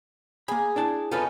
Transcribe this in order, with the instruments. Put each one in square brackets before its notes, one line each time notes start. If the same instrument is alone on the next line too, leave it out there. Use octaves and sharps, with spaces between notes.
[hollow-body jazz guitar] A#3 B5 [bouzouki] G#4
[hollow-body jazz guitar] D4 E4 A5
[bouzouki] B3 C#4 D#4 [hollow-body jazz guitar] F4 A4 B4